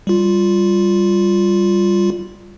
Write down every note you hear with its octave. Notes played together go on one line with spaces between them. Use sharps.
G3 F4